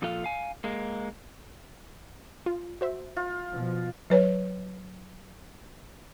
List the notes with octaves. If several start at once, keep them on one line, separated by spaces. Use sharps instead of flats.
A#2 F3 F4 A4 F5
F5 G#5
G#3 A#3
F4
F#4 C5 E5
F4
B2 F3
F#3 B4 C#5